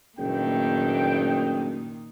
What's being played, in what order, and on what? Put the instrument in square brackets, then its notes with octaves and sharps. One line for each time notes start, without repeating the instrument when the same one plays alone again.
[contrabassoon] F#1 [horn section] G2 A3 G5 [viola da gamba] A#2 D#3